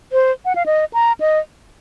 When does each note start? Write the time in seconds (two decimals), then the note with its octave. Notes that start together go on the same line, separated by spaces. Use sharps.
0.12 C5
0.45 F#5
0.55 F5
0.66 D#5
0.93 A#5
1.20 D#5